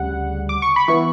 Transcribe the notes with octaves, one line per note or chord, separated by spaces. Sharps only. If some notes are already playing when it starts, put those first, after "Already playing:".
Already playing: D2 C#3 G3 F#5
D6
C#6
B5
E3 B3 E4 C#6